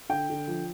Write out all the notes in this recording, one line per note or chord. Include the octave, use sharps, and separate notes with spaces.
D3 G5
D3
F3